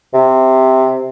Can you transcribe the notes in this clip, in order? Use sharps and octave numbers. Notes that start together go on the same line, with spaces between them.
C3